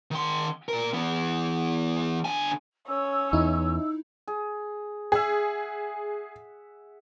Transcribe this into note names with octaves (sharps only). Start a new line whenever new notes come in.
D#3 C6
A#2 A#4
E3 B3
D3 G#5
C#4 C#5 E6
E2 D#4 E4
G#4
G#4 E5 F#5